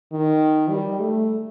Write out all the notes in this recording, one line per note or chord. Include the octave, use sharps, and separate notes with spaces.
D#3
G3
A3